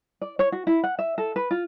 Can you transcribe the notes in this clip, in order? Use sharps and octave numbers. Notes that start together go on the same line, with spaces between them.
D5
C#5
F#4
E4
F#5
E5
A4
B4
F4